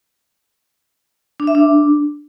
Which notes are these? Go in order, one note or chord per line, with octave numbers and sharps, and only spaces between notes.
D4
E5
D4